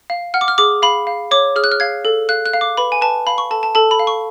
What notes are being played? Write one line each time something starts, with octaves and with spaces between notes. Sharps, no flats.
F5
F#5 F6
D6
F6
G#4 D6
F5 B5
F5
C#5 D6
G#4 F6
F#6
F6
F5 G#6
A4
F5 F#6
F#6
F5
D6
B4 B5
G#5
B4 A5
F5 B5
C#6
A4 A5
A5
A4 A5
B5
F5
C#6